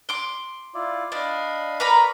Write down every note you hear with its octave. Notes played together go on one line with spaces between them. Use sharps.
C6 D6
E4 F4 D5
D4 D#5 F5 B5
A#4 B4 D5 A#5 B5 C#6